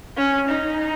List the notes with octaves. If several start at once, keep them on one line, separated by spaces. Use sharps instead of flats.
C#4
D#4